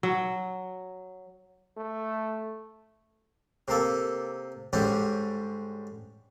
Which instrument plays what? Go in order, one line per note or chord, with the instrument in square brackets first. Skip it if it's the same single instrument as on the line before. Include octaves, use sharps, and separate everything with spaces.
[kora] F#3
[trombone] A3
[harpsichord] C3 A#3 A4
G#2 D3 G3 C#4 G4